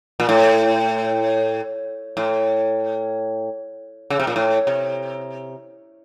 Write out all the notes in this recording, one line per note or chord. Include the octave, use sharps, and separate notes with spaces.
A#2
A2
A2
C#3
C3
A#2
A2
C3